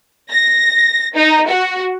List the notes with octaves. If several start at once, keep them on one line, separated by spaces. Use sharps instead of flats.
A#6
D#4
F#4